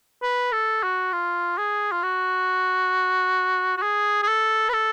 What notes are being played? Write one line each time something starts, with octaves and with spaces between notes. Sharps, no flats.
B4
A4
F#4
F4
G#4
F4
F#4
F#4
G#4
G#4
A4
B4
A4